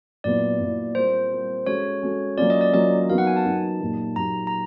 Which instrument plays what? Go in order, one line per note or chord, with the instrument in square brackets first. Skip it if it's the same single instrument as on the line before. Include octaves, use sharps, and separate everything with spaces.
[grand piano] A#2 F#3 B3 E4 [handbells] D5
[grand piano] A#2 F#3 B3 E4
[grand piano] G3 C4 F4 A#4 [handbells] C5
[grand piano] G3 C4 F4 A#4
[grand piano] G#3 C#4 F#4 A4 [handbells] C#5
[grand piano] G#3 C#4 F#4 A4
[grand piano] F#3 A#3 C#4 F4 [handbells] D5
[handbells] D#5
D5
[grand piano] F#3 A#3 C#4 F4 [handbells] D#5
[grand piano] F#3 B3 D#4 F#4 A#4 [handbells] F5
[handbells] F#5
G#5
A5
[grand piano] F#3 B3 D#4 F#4 A#4
A#2 F#3 A#3 D#4 G4
[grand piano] A#2 F#3 A#3 D#4 G4 [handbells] A#5
[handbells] A#5